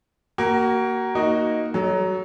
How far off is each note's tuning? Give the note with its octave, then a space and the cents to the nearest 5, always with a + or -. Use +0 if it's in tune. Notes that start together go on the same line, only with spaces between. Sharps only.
A#3 +0 F#4 +30
A#3 +0 D#4 +0 F#4 +0
F#3 +20 A4 -30 D#5 +0